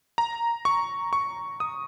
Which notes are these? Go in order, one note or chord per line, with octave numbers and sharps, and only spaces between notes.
A#5
C#6
C#6
D#6